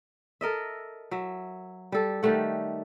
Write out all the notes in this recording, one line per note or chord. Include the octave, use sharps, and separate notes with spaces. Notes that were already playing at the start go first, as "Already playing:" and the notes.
A4 A#4 D#5 E5
F#3 E5
G3 A4
D#3 G3 A3 F#5